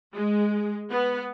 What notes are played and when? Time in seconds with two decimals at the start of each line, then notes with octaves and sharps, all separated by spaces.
0.14 G#3
0.90 B3